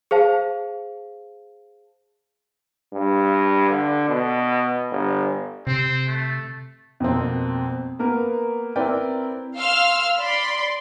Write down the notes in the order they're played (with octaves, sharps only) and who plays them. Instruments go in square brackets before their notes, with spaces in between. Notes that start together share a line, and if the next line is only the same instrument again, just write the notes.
[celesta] G#4 C5 F5 A5
[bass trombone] G2
D3
B2
G1
[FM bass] C3 [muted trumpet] C4
[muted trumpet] A3
[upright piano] F2 B2 A#3 C4
A#3 B3 A#4 B4
C4 E4 A#4 B4 D5 G5
[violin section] F5 C6 E6 F6
D5 B5 C6